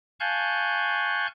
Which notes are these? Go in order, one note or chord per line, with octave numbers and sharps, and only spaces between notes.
F5 G#5 A5 C#6 F#6 G6